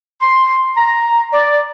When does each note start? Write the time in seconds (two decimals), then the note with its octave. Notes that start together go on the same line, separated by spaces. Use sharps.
0.22 C6
0.77 A#5
1.33 D5